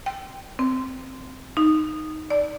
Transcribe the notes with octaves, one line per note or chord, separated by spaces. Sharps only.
G5
C4
D#4
D5